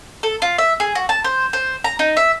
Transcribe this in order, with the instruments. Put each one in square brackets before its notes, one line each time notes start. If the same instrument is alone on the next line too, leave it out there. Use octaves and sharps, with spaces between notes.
[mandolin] A4
F4
E5
G#4
F#4
A5
C5
C5
A#5
D#4
E5